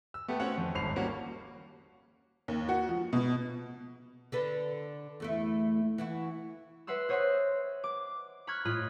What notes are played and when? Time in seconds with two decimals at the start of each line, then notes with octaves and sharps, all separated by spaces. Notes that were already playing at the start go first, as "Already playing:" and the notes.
0.14 E6
0.28 A3 B3 G4
0.40 C4 C#4 F#4 C#5 F#5
0.58 F2
0.75 D#1 G#1 C7 F7
0.96 G3 A#3 C#4 F#4
2.48 D#2
2.69 F#4
2.89 F3
3.13 B2
4.32 D3 A4 B4
5.20 E2 A3 E4
5.98 E3 E4 F#4
6.87 B4 E5 F#5 C6 E6
7.09 C5 C#5 D#5 E5 F#5 C6
7.84 D6
8.47 B5 C#6 F6 F#6 G#6
8.65 A2 F4 D#5 B5